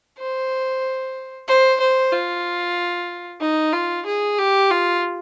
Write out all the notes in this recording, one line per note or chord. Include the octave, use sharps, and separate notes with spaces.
C5
C5
C5
F4
D#4
F4
G#4
G4
F4